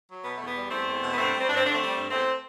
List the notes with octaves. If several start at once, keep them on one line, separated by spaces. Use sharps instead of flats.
F#3
B2 B3
E2 A3
B3
G3
E2 A3 C4
E2
B2
B3
G2 A3 C4
G3
C4
G2 D4
C4
D3 D4
A3 C4
G3
G2
E2 A3 C4